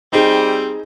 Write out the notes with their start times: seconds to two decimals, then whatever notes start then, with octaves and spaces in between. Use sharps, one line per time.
0.13 G3 C4 D#4 G#4